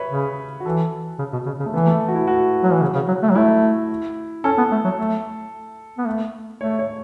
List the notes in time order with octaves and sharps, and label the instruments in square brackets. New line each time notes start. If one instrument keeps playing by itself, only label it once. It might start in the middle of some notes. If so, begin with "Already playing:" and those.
Already playing: [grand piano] B4 C#5 E5
[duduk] C#3
[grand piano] F#4
[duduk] E3 [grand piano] A4
[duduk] C#3
B2
C#3
C#3
[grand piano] A3
[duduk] E3 [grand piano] B3
[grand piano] A3
F#4
E4
F#4
[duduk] F#3
E3
C#3
C#3
F#3
A3
F#3
[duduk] A3 [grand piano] E4
[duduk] C#4 [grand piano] A4
[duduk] B3
A3
F#3
A3
B3
A3
[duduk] A3 [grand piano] C#5
[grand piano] C#5